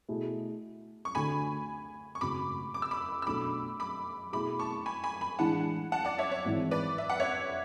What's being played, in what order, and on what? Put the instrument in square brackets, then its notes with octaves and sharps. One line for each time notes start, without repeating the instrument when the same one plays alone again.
[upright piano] B2 A3 E4 G#4
[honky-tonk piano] C#6
[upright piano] D2 D3 A3 D4 A4 [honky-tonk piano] G#5 B5
[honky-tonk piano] C#6
[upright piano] G#1 F#2 C#3 F#3 A3 [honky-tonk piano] B5 D6
[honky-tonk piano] D6
E6
B5 D6
E6
[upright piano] B1 B2 A3 D4 A4 [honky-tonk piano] B5 D6
[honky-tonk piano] B5 D6
[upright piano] B2 A3 E4 G#4 [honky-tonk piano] B5 D6
[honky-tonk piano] A5 C#6
G#5 B5
G#5 B5
G#5 B5
[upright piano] A2 E3 G#3 D4 [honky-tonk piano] F#5 A5
[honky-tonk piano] F#5 A5
D5 F#5
C#5 E5
C#5
[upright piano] G#1 G#2 E3
[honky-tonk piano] B4 D5
E5
F#5
C#5 E5